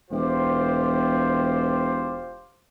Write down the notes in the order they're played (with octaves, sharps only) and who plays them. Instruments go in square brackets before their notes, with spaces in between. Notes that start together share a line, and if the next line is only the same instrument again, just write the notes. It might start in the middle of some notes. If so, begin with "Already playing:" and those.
[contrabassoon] E1 [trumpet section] F4 G4 C5